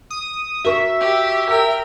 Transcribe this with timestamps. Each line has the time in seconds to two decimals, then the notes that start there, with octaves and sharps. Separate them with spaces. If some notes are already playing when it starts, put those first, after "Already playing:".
0.10 D#6
0.64 F#4 A#4 E5 C#6
1.01 G4
1.50 A#4 G5